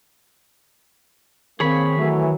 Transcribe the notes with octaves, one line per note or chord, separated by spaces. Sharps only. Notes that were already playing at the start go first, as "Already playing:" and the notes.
D#3 A#3 C4 G#4 C#5 B5
E3 F#3 A3